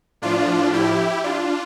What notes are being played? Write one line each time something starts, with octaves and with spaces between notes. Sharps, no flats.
A2 F3 D4 F4
E4 G4
D4 F4